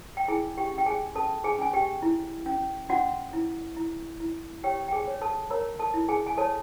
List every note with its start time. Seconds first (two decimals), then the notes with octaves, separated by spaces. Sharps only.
0.17 G5
0.28 E4 G#4 G#5
0.57 G4 G5
0.72 C#4
0.78 G5
0.86 G#4 G#5
1.15 C#4 A4 A5
1.44 G#4 G#5
1.58 C#4 G#5
1.73 G4 G5
2.02 E4
2.46 C#4
2.89 C#4 F#4 F#5
3.33 E4
3.77 E4
4.20 E4
4.64 G4 C#5 G5
4.88 G5
4.92 G#4 G#5
5.07 C#5
5.21 A4 A5
5.50 A#4 C#5 A#5
5.79 A4 A5
5.94 E4
6.09 G#4 G#5
6.26 G#5
6.37 A4 C#5 A5